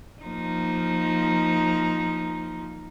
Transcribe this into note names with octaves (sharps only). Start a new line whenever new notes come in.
F3 A#3 D#4